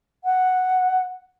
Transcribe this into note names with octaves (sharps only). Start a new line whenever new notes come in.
F#5